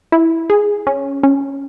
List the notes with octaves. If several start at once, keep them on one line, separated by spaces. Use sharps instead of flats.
E4
G#4
C#4
C#4